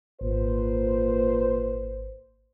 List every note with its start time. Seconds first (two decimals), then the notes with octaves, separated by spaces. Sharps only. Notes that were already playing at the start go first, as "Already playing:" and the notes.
0.21 G#1 A#2 B4 C5